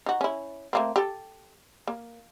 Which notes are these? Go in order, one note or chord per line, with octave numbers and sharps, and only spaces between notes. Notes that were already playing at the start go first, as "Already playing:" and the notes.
D#4 F#4
C#4 E4
A3 A#3 C4
G4 A4
A#3